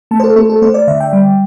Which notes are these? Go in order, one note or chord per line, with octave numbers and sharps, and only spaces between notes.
A3 A5
C5
A4
A3 A4
A4
A3 C5
D5
D3 E5
G5
G3